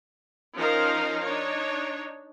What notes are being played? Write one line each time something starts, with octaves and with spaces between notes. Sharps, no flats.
F3 C#4 D#4 A#4 C5 F5
D4 D#4 C#5